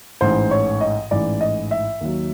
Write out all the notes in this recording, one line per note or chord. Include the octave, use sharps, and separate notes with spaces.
A1 G#2 E3 C5
C#5
D#5
A1 G#2 E3 D5
D#5
E5
D#2 D#3 F#3